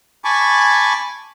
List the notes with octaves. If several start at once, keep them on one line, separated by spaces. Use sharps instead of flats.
G#5 A5 B5 C#6 D6